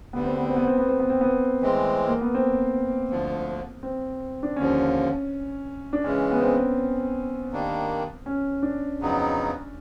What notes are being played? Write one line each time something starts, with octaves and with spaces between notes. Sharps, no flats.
D2 D3 G3 B3
C4
B3
C4
B3
C4
B3
C4
B3
C4
B3
A2 E3 G#3 C4
A#3
B3
C4
D2 D3 F3
C4
D4
D#2 D3 F3 C#4
D4
C#3 E3 G#3 C#4
B3
C4
D#3 G3 A#3 D4
C#4
D4
F2 C#3 F#3 B3 D#4